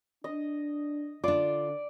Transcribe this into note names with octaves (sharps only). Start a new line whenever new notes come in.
D4 D#5
D3 D4 F4 D5